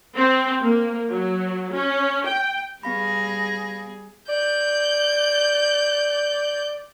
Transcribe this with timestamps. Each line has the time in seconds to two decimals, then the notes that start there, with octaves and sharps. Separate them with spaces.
0.17 C4
0.61 A#3
1.11 F#3
1.72 C#4
2.26 G5
2.83 G3 B3 G#4 F5 B5 A#6
4.29 D5 G6